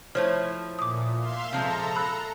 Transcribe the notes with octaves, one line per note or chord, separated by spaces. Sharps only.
F3 A3 E4 C5 C#5 F6
A#2 D6 D#6
E5 F5 C6
C3 F3 G#3 A4 A#5
B5 E6 F#6